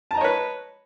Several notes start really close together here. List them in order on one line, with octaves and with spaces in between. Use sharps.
A5 A#5 D#5 C#5 B4